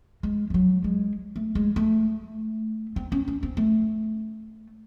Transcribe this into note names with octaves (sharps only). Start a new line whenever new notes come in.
G#3
G#3
F#3
G#3
A3
G#3
A3
C4
C#4
C#4
C4
A3